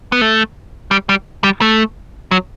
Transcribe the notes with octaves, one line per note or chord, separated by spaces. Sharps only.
B3
A3
G3
G3
G3
A3
F#3